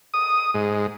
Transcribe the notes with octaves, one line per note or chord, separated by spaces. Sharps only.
D#6
G#2